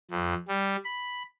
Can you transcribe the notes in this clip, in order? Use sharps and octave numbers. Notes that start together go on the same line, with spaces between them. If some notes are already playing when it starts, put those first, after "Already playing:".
F2
G3
B5